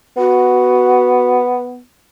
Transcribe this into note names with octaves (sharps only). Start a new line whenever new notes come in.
B3 F#4